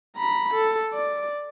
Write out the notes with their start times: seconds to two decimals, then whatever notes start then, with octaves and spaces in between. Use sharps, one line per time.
0.17 A#5 B5
0.54 A4
0.94 D5